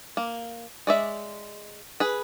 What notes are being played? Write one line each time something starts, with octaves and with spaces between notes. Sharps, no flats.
A#3
G#3 D5 E5
G#4 B4